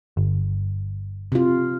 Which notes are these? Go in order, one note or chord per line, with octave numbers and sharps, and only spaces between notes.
G1
C3 F4